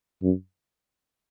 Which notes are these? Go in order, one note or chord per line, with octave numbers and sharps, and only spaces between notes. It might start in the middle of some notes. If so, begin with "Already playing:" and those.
F#2